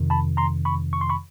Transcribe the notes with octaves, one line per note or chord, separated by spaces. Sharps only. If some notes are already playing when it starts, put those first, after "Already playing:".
Already playing: F2 C3 D#3
A5 B5
A#5 C6
B5 C#6
C#6
C6
B5 C#6